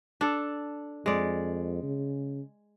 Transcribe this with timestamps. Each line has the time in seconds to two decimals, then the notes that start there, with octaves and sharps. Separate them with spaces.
0.21 D4 A4
1.06 F2 G#3 D5
1.83 C#3